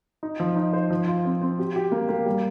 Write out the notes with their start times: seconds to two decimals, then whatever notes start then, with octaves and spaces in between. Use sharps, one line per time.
0.23 D#4
0.40 F3
0.56 D#4
0.73 C5
0.90 F3
1.08 F4
1.25 C4
1.41 C4
1.59 G4
1.76 G4
1.92 A#3
2.09 A#3
2.26 G3